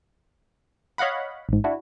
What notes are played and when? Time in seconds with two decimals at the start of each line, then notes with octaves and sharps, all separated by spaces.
0.98 C#5 D#5 F5 F#5 B5
1.49 A1 G#2
1.64 D4 E4 F#4